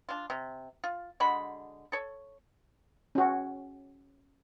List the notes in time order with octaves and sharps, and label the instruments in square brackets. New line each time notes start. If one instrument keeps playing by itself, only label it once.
[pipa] D4 F4
C3
F4
D3 G#3 F#4 B5
A4 C#5
[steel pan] C#4 F#4